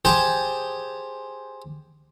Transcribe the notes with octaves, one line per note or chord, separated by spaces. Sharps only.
G4 G#4 C5 G5 A5